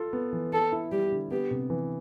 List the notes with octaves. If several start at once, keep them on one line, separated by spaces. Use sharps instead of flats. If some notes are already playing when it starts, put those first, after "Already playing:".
Already playing: F4 A4
B3
E3
B3 A4
E4
G3 G4
D3
B3 G4
C3
E3